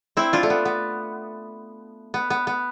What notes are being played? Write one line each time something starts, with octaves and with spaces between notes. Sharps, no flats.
C4 E4
D4 F4
A3
B3
B3
B3
B3
B3